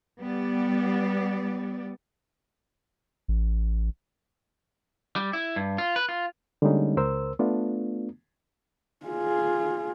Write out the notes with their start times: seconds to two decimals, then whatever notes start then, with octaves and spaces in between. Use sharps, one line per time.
0.19 G3 B3 D5
3.28 A1
5.16 G3
5.33 E4
5.56 G2
5.78 F4
5.96 B4
6.09 F4
6.62 D3 G3 G#3 A#3 C#4 D#4
6.97 C#2 A#4 C5 E6
7.39 A3 B3 D4 F4
9.07 F4 G#4